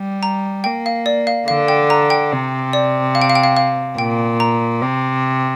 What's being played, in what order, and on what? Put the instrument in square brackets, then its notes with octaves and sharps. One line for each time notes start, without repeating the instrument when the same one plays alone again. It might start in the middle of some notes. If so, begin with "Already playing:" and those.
Already playing: [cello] G3
[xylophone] A#5
[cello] A#3 [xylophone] G5
[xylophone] F5
D5
F5
[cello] D3 [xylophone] F5
[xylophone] G5
A#5
G5
[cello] C3
[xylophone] D5
F5
G5
F5
G5
F5
F5
[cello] A#2 [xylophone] G5
[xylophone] A#5
[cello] C3